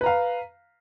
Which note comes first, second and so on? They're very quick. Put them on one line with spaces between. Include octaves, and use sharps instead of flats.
B4 A#5 F5